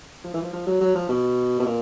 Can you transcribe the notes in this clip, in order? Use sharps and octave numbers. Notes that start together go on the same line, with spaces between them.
F3
E3
F3
F3
F#3
F#3
F3
B2
B2
A#2